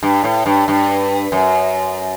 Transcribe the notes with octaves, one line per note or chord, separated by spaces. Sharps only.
G2
A2
G2
G2
F#2